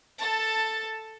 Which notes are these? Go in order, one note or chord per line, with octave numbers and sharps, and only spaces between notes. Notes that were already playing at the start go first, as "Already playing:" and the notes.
A4 A5